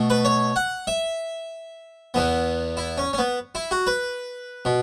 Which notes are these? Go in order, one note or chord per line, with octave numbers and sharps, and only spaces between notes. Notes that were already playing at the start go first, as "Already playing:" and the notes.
Already playing: B2 A3
B4
C#5
F#5
E5
E2 E3 B3
E4
C#4
C#4
B3
E4
F#4
B4
B2